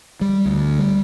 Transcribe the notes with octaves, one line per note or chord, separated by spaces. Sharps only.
G3
D2
G3